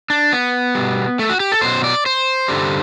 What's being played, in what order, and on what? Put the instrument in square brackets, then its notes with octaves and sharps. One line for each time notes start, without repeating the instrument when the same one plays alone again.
[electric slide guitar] D4
B3
B2 G3
A3
F#4
G4
A4
B2 F#3 C5
D5
C5
G2 D3 G3